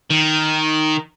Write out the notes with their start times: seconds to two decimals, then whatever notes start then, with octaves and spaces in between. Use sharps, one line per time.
0.10 D#3